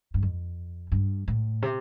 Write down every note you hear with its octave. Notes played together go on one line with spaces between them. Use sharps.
G2
F2
G2
A2
C3